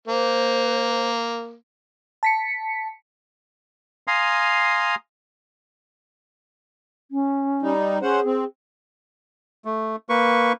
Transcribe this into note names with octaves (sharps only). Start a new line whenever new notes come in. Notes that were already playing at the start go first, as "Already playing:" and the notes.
A#3 C5
A5 B6 C#7
F5 G#5 A#5 C6 D#6
C#4
G3 D#4
C#4 G#4 C5 F#5
C4
A3
A#3 B4 C#6